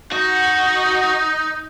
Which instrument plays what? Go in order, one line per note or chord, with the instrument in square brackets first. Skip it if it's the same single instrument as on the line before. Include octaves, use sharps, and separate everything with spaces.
[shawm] D#4 [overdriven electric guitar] F#4